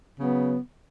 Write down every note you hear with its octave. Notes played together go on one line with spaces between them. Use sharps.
C#3 F#3 B3